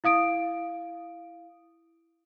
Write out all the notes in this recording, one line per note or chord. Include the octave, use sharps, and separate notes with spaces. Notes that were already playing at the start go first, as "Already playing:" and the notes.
E4 F5 D#6 D7